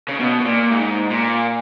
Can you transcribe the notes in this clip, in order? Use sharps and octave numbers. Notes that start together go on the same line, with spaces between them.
C#3
B2
B2
A#2
G#2
A#2